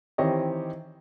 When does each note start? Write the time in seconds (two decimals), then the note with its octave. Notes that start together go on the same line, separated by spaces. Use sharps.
0.18 D#3 E3 C4 G4 C#5 D#5